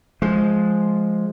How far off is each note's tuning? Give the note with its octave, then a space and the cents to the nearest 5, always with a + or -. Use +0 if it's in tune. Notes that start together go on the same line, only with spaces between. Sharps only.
F3 +0 G#3 +10